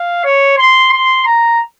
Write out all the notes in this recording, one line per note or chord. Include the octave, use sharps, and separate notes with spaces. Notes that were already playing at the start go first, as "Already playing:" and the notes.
Already playing: F5
C#5
C6
C6
A#5